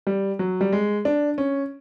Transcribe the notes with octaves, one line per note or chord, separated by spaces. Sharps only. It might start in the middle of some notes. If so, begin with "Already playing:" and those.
G3
F#3
G3
G#3
D4
C#4